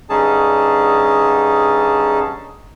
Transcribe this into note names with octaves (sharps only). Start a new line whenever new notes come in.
G2 D3 C#4 D#4 G#4 A5